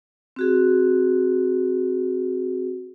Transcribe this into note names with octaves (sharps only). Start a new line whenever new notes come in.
C4 F#4 G#4